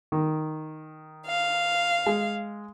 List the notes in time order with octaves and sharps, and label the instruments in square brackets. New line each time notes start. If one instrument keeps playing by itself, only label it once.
[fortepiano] D#3
[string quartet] F5
[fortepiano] G#3